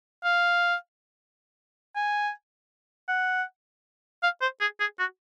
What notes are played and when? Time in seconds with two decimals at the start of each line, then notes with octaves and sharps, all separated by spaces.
0.24 F5
1.96 G#5
3.09 F#5
4.23 F5
4.42 C5
4.61 G#4
4.80 G#4
4.99 F#4